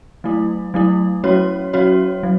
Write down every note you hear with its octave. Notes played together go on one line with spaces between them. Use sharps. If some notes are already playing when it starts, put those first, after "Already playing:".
F#3 A3 E4
F#3 A3 E4
F#3 C#4 F#4 C#5
F#3 C#4 F#4 C#5
F#3